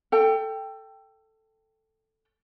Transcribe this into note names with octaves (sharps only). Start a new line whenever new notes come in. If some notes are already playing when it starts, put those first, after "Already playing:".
A4 G5